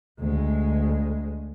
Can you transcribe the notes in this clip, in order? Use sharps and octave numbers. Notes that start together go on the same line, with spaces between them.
D2 G#3